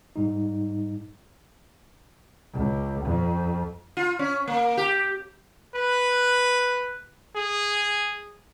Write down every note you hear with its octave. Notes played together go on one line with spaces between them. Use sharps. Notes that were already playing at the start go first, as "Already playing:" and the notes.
G#2 G3 D#4
C#2
F2
F4
C#4
A#3
G4
B4
G#4